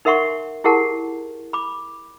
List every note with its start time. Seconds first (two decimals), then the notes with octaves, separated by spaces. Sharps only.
0.05 D#4 A#4 E5 F#5 C6 C#6
0.64 E4 G4 G#4 A#4 F#5 A5
1.53 B5 D6